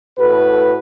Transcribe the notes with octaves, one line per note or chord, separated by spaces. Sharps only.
A2 F#4 A4 B4